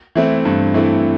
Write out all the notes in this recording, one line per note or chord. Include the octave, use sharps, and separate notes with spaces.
E3 A3 C4 E4
G2
E3 A3 C4 E4